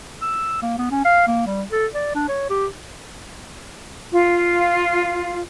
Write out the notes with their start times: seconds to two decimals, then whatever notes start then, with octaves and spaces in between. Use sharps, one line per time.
0.22 E6
0.63 A#3
0.78 B3
0.91 C#4
1.05 F5
1.28 A#3
1.47 G3
1.72 A4
1.95 D5
2.15 D4
2.29 C#5
2.50 G4
4.12 F4